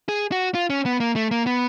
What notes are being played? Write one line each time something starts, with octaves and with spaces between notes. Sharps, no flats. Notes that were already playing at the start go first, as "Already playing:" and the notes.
G#4
F#4
F4
C#4
B3
A#3
A3
A#3
B3